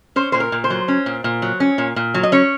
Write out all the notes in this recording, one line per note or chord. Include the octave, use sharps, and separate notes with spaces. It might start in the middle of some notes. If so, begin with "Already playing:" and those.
C#4 C5
A#2 C5
A#4
A#2
C5
F#3
C#4
A#2
A#2
F#3
C#4
A#2
A#2
F#3
D#5
C#4 C#5